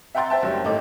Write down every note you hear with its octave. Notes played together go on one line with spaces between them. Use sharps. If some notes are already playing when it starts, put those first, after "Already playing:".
E5 F#5 G5 A#5 C6 A6
C5 E5 G5 A5
F#1 F#3 G3
G#1 A2 D#4 A4 D#5 D6